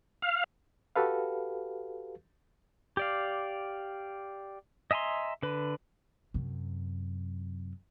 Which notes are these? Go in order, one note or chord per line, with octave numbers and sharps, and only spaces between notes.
F5
F#4 G4 A4 B4 F5
G4 D5 F5
D#5 E5 G#5 A#5 C6
D3 B4
F#2 C3